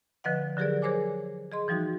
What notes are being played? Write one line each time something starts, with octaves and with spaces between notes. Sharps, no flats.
D3 F3 B4 D#5 F#5
D3 F#3 G4 G#4 A#4 D5
G#4 A#4 C5 C#5 G#5 D6
G#4 D#5 C6
E3 F3 G3 D#4 F#4